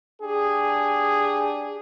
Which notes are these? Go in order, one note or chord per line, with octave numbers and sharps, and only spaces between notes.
D4 G4 G#4